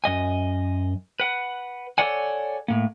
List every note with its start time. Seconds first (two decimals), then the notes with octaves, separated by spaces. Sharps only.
0.04 F#2 D#5 G#5
1.20 B4 F#5
1.98 A4 B4 C#5 D5 F#5 G#5
2.68 A2 A#3